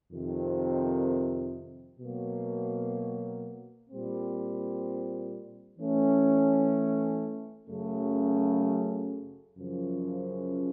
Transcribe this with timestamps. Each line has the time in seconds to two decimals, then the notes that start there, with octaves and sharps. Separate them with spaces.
0.11 F2 C3 D#3
2.00 B2 F#3 A#3
3.89 A#2 G3 C4
5.78 E3 A3 C#4
7.68 F#2 C#3 F#3 A3
9.58 F#2 C#3 F3